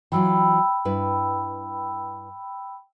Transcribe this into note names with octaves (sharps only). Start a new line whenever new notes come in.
E3 F#3 F4 G5 B5 E6
G2 E4 B4